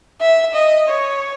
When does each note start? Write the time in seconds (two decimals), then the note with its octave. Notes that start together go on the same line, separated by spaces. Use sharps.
0.21 E5
0.55 D#5
0.88 C#5